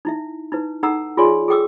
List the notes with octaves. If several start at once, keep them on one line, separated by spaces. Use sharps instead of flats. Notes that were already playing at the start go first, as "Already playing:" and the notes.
D#4 E4 E5
D#4 E4 B4
D#4 A4 F#5 A#5 E6
F4 G#4 C#5 D5 G#5 C6
G#4 A4 G5 D6 E6